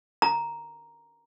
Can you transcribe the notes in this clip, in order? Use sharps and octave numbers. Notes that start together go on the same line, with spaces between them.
A#5